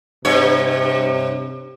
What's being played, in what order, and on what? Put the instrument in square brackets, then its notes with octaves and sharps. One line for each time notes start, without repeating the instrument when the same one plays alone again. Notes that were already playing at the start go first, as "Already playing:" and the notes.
[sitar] G2 C#5 [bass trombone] C3